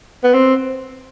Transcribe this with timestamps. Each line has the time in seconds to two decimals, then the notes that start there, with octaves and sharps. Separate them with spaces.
0.23 B3
0.34 C4